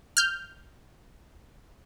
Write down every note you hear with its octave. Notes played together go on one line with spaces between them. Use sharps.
F6 G6